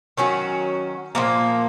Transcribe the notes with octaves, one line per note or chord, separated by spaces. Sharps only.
D#3 F#3 C#4 F#4
A#2 F3 A#3